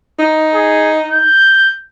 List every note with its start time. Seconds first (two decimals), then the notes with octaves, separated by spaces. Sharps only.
0.19 D#4
0.54 G#4
1.11 G6